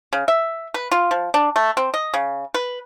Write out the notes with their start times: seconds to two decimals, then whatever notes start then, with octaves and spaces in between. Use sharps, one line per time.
0.13 C#3
0.28 E5
0.74 B4
0.92 F4
1.11 F3
1.34 D4
1.56 A3
1.77 C4
1.94 D#5
2.14 C#3
2.54 B4